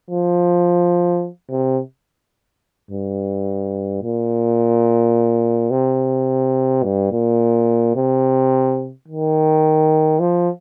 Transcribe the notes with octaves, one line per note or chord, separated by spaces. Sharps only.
F3
C3
G2
A#2
C3
G2
A#2
C3
D#3
F3